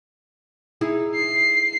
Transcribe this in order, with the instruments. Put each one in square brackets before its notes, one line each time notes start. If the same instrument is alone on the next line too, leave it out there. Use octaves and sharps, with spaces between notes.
[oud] D#4 E4 G#4
[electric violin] C7